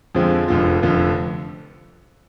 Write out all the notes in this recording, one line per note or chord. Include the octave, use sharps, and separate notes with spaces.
F2 D3 F3 G#3 C4
F1 F2 D3 F3
F1 F2 D3 F3